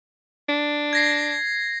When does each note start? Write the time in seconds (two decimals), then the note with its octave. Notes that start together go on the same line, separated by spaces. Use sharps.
0.49 D4
0.93 G#6 A#6 C7